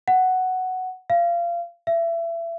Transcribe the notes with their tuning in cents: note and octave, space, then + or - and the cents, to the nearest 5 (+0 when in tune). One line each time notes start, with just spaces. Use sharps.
F#5 +5
F5 -25
E5 +30